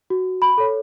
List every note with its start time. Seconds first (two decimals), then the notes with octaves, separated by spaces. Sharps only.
0.10 F#4
0.42 B5
0.57 A4 C#5